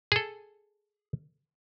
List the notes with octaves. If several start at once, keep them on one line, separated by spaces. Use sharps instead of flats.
G#4 A4